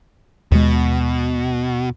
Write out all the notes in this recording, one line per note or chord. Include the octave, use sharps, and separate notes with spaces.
D#2 B2 G#3